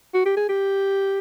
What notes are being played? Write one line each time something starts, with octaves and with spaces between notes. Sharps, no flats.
F#4
G4
G#4
G4